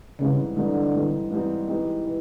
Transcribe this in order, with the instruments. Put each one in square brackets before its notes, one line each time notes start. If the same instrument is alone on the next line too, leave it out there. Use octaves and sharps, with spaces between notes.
[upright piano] G#2 E3 G3 C4 D#4 [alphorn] C#3
[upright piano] G#2 E3 G3 C4 D#4 [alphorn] D3
[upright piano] G#2 E3 G3 C4 D#4
G#2 E3 G3 C4 D#4
E3 G#3 C4 D#4 G4
E3